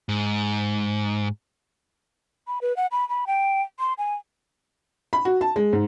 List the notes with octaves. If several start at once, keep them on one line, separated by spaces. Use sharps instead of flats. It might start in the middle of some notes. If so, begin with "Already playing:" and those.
G#2
B5
B4
F#5
B5
B5
G5
C6
G#5
B5
F#4
A5
G#3
G#2